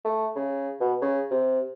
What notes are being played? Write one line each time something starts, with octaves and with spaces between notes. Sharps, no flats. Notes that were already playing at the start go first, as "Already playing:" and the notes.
A3
C#3
B2
C#3
C3